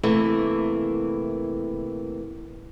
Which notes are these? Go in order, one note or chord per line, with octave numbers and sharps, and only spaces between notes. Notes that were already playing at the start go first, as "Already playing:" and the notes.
C3 E3 A3 A#3